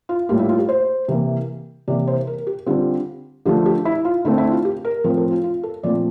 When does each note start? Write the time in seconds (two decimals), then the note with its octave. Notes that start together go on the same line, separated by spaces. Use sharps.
0.09 F4
0.29 A2 G3 A#3 F4
0.39 E4
0.49 F4
0.59 G4
0.69 C5
1.08 C3 E3 A#3
1.88 C3 E3 A#3 D5
2.07 C5
2.27 A#4
2.47 G4
2.66 D3 G3 C4 F4
3.46 D3 F3 A3 G4
3.66 G4
3.85 E4
4.05 F4
4.25 D3 A3 C4 E4
4.38 E4
4.51 F4
4.65 G4
4.85 A#4
5.04 A2 F3 C4 A#4
5.17 A4
5.31 F4
5.44 F4
5.63 A4
5.83 A#2 F3 A3 C4 D5